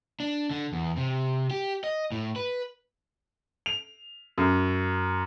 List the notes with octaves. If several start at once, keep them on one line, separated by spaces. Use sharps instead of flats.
D4
D3
E2
C3
G4
D#5
A2
B4
F7
F#2